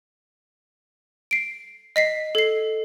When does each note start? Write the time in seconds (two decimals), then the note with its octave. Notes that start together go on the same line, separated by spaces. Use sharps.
1.31 C7 D7
1.96 D#5 B6 C7
2.35 A4 C7